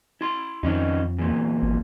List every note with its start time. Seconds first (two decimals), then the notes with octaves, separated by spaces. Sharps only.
0.21 E4 C6
0.63 F2 D#3 C#4 D#4
1.18 E2 A#2
1.62 G#1